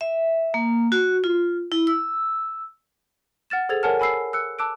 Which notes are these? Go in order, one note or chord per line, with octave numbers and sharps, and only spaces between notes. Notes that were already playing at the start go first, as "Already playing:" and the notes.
E5
A#3
F#4
F4
E4
E6
F#5 F6 A6 E7
G#4 A4 C5 G#6 A6 F7
A#4 C#5 F#5 G#5 A5 F6
G#5 B5 E6 C7
E6 F#6 C#7
A5 D6 E6 F#6 D7